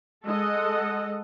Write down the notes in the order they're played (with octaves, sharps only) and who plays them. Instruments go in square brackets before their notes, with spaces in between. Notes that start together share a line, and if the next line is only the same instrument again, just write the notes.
[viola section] G#3 A4 D#5 F#5